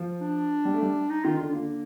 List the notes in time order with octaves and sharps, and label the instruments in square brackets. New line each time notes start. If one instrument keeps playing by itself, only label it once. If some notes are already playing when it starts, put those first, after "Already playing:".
Already playing: [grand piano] F3
[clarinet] D4
[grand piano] G3
A3
G3
[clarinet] D#4
[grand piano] D#3 [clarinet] F4
[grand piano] D3 [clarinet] F4
[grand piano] D3 [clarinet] A#3